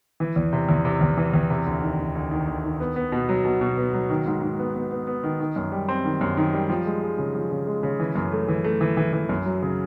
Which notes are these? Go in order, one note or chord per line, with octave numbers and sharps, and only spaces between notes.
E3
E2
C3
E2
C3
E2
E3
E2
C3
D2
D#3
D2
D2
D#3
D2
D#3
B3
B3
B2
F#3
B2
B2
B3
F#3
D#3
G#2
G#2
B3
B3
B3
B3
D#3
D#3
F#2
G3
C4
D#3
F#2
D#3
G3
F3
G#3
G#3
C#3
F3
C#3
G#3
C#3
E3
F#2
A3
E3
A3
E3
E3
E3
F#2
F#3
C#3